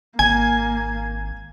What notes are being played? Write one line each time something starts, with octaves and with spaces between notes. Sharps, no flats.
G#1 A#3 G#5 G#6